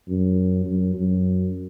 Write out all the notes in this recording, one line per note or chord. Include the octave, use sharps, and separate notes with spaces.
F#2
F#2
F#2